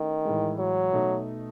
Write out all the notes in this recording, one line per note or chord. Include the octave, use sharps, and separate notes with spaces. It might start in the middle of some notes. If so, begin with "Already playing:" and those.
Already playing: D#3 A3 C#4 E4
A2 E3 G#3
F#3
B2 A3 D#4